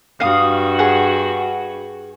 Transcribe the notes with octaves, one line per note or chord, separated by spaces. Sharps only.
G2 F#4 F5 D#6
G#4 F#5